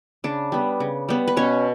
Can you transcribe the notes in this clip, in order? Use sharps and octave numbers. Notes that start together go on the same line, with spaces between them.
C#3 D4
G3 B3
C#3
G3 B3
B4
B2 C#4 C#5